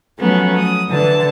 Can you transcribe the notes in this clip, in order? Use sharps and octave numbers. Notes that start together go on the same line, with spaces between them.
F3 F#3 A3 B3 C#4
D#6
D3 E3 A5